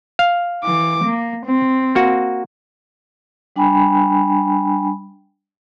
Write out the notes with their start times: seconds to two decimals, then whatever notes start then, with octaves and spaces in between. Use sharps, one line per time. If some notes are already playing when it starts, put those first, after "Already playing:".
0.19 F5
0.62 E3 D6
1.05 A#3
1.46 C4
1.95 A#3 F#4
3.56 G3 D4 G5 G#5 B5